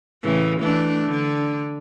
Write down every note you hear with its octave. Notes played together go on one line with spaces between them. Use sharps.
A2 C#3 E3
E3 A3 D4
D3 D4